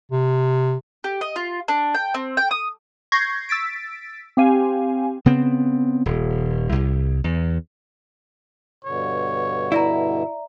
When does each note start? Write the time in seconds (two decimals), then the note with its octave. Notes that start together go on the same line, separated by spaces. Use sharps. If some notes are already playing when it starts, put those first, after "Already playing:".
0.12 C3
1.04 G4
1.21 D#5
1.36 F4
1.68 D4
1.94 G5
2.14 C4
2.37 G5
2.51 D#6
3.12 C#6 G6 G#6 A#6 C7
3.49 E6 A6 B6 D7
4.37 C4 G4 F5 G#5
5.26 C#3 B3 C4
6.06 D#1
6.72 C2
7.24 E2
8.85 G2 B2 D3 C#5
9.72 E4 D5 E5 A#5